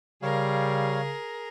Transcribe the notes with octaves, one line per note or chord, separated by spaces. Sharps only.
C#3 G3 G#4 A#4 C#5 F5